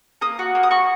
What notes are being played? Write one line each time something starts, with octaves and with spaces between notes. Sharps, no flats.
A#3 D#6
F#4
A#3
D#6
F#4 C#6